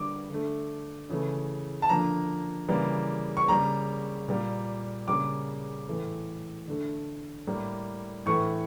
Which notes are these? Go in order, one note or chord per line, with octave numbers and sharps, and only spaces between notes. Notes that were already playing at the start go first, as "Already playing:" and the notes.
Already playing: D3 G3 A#3 D6
D3 A3
C#3 E3 A3
A5
D3 F3 A#3 A#5
C#3 E3 G3 A#3
C#6
C#3 G3 A#3 A#5
A#2 G3 A#3
C#3 G3 A#3 D6
A2 E3 A3
D3 A3
A2 G3 A#3
A2 E3 A3 C#6